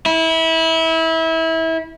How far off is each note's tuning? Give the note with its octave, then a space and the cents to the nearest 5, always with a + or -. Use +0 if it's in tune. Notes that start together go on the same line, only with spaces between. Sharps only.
E4 -25